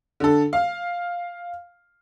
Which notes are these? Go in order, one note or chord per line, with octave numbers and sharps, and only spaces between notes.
D3 A4
F5